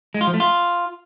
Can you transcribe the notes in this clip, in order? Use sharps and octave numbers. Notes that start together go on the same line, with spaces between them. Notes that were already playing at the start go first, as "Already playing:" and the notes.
G#3
F4
F3
A3
F4